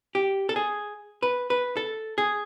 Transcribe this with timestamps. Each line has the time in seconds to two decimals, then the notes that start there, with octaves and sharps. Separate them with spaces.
0.15 G4
0.49 A4
0.56 G#4
1.23 B4
1.50 B4
1.77 A4
2.18 G#4